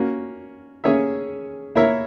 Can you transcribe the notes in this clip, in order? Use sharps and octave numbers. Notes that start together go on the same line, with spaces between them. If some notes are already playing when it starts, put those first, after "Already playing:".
Already playing: A#3 C#4 F#4
A#3 C#4 G#4 C#5 E5
A#3 E4 A#4 C#5 E5